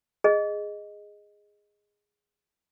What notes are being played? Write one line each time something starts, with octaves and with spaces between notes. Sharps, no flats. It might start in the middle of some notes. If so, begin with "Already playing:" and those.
G#4 D#5